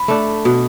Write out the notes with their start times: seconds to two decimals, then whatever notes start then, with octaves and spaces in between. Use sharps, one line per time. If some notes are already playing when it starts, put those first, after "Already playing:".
Already playing: B5
0.08 A3 D4
0.45 B2